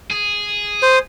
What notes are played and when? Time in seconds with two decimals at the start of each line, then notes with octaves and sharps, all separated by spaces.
0.11 G#4
0.82 C5